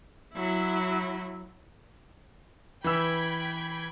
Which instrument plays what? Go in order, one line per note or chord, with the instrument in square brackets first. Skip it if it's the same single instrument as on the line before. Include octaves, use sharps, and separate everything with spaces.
[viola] F#3 E4
[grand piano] E3 E6 [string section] G5 B5 G#6